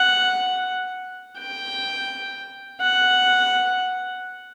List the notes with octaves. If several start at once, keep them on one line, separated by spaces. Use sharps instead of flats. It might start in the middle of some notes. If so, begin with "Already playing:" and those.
Already playing: F#5
G5
F#5